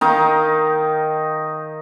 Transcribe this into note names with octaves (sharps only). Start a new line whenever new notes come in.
D#3 D#4 F5